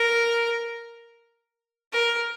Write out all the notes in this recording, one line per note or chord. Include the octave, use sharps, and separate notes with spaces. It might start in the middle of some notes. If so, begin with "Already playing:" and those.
Already playing: A#4
A#4